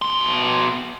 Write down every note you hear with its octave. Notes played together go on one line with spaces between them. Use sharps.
B2 C6